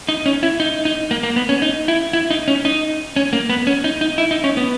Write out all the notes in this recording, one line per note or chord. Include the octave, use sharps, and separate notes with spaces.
D#4
C#4
E4
D#4
D#4
A#3
A#3
B3
C#4
D#4
E4
E4
D#4
C#4
D#4
C#4
A#3
B3
C#4
D#4
D#4
E4
D#4
C#4
B3